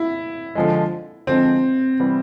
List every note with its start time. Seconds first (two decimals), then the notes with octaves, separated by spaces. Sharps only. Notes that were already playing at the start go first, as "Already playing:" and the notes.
Already playing: E4
0.55 D3 F3 G#3
1.27 D3 F3 G#3 C4
2.00 C3 E3 G3 B3